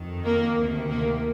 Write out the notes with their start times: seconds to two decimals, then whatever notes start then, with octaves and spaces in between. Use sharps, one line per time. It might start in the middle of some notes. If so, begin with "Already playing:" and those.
Already playing: F2 D#3
0.24 A#3
0.57 D2 C3 D#3
0.90 A#3